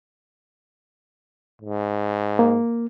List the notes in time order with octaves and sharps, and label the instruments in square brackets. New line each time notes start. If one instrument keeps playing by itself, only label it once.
[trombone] G#2
[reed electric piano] A#3